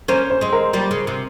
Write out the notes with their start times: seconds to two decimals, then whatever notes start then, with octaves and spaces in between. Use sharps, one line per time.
0.08 A#3 C#4 C5
0.30 C5
0.41 G#3 C4
0.53 A#4
0.73 G3 A#3
0.91 C#3
1.07 C3